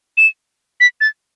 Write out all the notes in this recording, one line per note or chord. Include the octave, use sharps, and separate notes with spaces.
E7
B6
A6